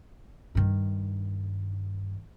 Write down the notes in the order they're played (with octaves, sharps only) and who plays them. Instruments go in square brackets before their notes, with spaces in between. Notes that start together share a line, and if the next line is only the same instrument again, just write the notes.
[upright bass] G2 D#3